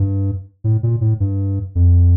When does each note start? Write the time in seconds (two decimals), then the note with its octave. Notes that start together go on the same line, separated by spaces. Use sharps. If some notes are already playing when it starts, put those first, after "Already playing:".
Already playing: G2
0.64 A2
0.83 A#2
1.01 A2
1.20 G2
1.75 F2